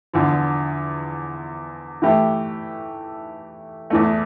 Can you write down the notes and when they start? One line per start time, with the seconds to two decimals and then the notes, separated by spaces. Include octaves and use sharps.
0.13 E2 D3 F3
2.02 E3 A3 E4 G4
3.90 E2 E3 A3